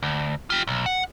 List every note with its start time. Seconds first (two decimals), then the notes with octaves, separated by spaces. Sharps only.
0.03 D2
0.50 F4 G4
0.67 B1
0.86 F#5